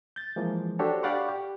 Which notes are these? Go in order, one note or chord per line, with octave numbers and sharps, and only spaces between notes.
G6 A6
E3 F3 G#3 A#3
D4 F#4 G4 A4 C5 C#5
G4 D5 F5 F#5 B5 C#6
G4